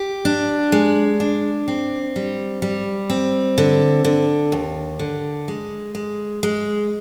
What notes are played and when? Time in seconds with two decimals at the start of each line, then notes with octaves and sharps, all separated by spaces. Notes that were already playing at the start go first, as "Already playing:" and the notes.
Already playing: G4
0.25 D4
0.72 G#3
1.20 D4
1.68 C4
2.16 G3
2.62 G3
3.10 C4
3.58 D3
4.04 D3
4.52 D#2
4.99 D3
5.48 G#3
5.95 G#3
6.43 G#3